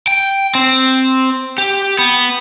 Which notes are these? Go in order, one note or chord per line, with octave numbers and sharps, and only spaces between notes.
G5
C4
G4
B3